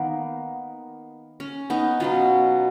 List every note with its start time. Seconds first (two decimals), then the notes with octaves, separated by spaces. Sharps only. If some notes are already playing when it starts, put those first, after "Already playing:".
Already playing: D#3 A#3 B3
1.40 C#4
1.70 B3 D#4
2.00 B2 F#3 B3 C#4 F4